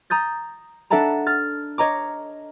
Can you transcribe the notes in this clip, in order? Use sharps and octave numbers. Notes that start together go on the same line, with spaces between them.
A#5 D#6 G6 A6
D4 A4 E5 F#5 A5 A#5
F6 A6
C#5 D#5 A#5 D6